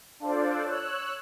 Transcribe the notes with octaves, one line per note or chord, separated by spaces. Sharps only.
D4 F4 A4 C5 D5
C#5 E6 F#6